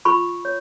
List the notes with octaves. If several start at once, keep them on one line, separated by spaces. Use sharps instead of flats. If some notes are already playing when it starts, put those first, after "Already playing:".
F4 B5 C#6
C#5